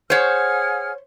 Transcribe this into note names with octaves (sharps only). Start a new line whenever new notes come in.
G#4 C5 C#5 F#5 F6